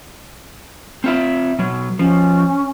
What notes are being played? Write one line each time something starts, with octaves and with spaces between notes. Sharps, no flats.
C4 F4 E5
B2 F#3
F3 C#4